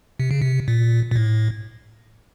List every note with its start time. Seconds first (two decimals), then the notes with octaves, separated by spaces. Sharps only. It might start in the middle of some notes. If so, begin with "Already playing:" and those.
0.20 C3
0.31 C#3
0.41 C3
0.68 A#2
1.11 A#2
1.16 A2